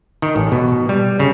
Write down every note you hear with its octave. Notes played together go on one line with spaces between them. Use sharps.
D#3
A1
B2
G3
C#3